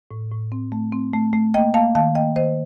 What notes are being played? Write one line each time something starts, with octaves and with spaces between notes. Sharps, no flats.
A2
A2
C4
A3
C4
A3
A3
A#3 D#5 G5
A#3 F5 A5
D#3 F5 A5
A#3 D#5 G5
D#3 C5 D#5